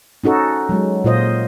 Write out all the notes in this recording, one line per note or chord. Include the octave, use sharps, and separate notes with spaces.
C#4 D#4 F#4 A4
F#3 G#3
A#2 F4 C5 D#5